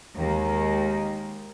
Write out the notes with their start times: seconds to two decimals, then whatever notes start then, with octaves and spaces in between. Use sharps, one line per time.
0.15 D#2 D#3 G#3 A#3